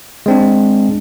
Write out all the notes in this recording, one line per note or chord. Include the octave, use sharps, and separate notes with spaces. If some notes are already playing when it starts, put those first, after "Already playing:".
G#3 C4 D4